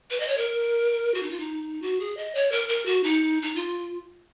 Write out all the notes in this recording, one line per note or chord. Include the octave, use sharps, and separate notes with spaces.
B4
D#5
C#5
A#4
F#4
D#4
F4
D#4
F#4
G#4
D#5
C#5
A#4
A#4
F#4
D#4
D#4
F4